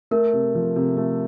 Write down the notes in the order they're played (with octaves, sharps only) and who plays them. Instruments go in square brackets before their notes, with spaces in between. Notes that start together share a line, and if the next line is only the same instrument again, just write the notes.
[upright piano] A3 [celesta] A#4
[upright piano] C3
F3
C3
A3